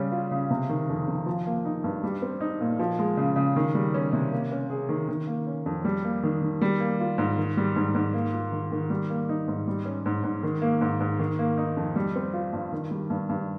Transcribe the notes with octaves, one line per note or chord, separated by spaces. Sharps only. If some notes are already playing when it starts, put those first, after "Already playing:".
Already playing: C#3 G3 C#4
F4
C#3
C3
D#3
F2
F2
F3
A#3
D#4
G2
G3
C4
D#4
A#2
F3
G#3
C#3
C#3
D#3
G3
C#4
C3
A#3
C#4
G#4
D#3
D#3
A#3
C#4
F2
G3
A#3
D#3
D#3
G3
A#3
F4
G#2
D#3
G3
G#2
G#2
A#3
F4
D#3
D#3
G3
A#3
D#4
G#2
G3
C#4
G#2
G#2
D#3
A#3
G#2
G#2
D#3
A#3
D#4
F2
G3
C4
F4
G2
D#3
G3
G2
G2